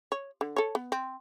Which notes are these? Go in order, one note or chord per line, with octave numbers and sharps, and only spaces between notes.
C#5
D3
A4 C#5
B3
C4